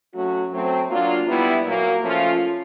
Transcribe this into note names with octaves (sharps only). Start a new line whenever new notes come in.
F#3 A3 C#4 F#4
F#3 A3 C4
F#3 A#3 D4 F4
G3 B3 E4
A#2 F#3 A#3
F3 A3 C#4 F4